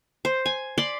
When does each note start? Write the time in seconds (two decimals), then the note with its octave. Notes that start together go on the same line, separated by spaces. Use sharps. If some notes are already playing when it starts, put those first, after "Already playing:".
0.25 C5
0.46 G#5
0.78 D5 B5 C6